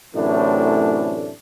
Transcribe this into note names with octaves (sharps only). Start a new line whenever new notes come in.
F#2 A2 C3 E3 A3 D4